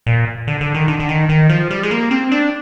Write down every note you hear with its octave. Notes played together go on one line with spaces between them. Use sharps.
A#2
D3
D3
D#3
D3
D3
D#3
D#3
F3
G3
G#3
A#3
C4
D4